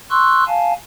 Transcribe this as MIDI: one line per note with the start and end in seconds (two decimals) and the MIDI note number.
0.10 0.44 84
0.10 0.44 85
0.10 0.44 88
0.10 0.44 90
0.47 0.73 77
0.47 0.73 80
0.47 0.73 81